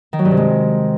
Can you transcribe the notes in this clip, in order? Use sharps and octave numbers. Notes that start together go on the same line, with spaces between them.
D#3
F#3
G2
C3
G#3